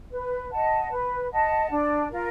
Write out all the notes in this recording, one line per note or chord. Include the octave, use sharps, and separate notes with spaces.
B4
D#5 F#5 A5
B4
D#5 F#5 A5
D4
F4 A#4